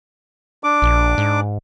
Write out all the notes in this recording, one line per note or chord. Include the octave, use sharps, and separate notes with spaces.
D4 D6
A#1
G#2